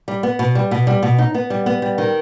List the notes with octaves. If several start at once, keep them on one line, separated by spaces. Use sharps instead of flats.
G3
B3
B2
G3
B2
G3
B2
D#4
B3
G3
B3
G3
D#3